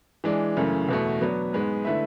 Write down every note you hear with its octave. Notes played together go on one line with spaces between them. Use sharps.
E3 G#3 D4
F#2 C#3 E3 A3
E2 B2 A3
F#3 B3 D4
G#2 G#3 B3
D3 A3 E4 B4 E5